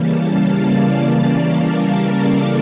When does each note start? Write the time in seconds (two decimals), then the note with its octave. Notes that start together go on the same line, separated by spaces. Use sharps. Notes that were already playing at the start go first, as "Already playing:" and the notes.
Already playing: C#3 E3 G3 A#3 C#4 A5
0.17 F5
0.46 D5
1.35 A#4
2.22 A4